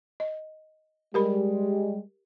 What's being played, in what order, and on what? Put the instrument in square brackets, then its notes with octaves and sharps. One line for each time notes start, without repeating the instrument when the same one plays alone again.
[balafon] D#5
[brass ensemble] G3 G#3 [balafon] G4 A#4 B5